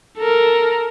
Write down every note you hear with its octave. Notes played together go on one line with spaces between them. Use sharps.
A4 A#4